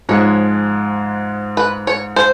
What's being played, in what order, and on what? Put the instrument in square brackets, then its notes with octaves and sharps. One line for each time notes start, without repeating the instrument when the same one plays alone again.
[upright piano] G#2 F3 G#3 [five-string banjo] C#5
[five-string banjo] B4
C#5
C5